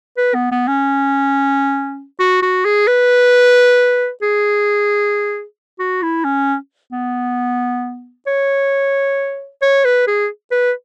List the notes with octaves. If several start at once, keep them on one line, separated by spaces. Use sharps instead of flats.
B4
B3
B3
C#4
F#4
F#4
G#4
B4
G#4
F#4
E4
C#4
B3
C#5
C#5
B4
G#4
B4